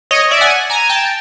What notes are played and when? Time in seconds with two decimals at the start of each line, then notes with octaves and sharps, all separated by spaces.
0.11 C#5 D#5
0.31 D5 E5
0.41 F#5 G#5
0.70 G#5 A#5
0.89 G5 A5